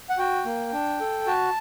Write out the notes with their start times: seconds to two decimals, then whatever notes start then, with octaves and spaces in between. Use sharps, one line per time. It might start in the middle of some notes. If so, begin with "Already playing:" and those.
0.09 F#5
0.18 F#4 G5
0.45 A#3
0.73 D4
1.00 A4
1.27 F#4 A5